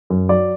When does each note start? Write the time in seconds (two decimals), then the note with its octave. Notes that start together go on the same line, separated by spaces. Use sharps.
0.10 F#2
0.29 F#3 D5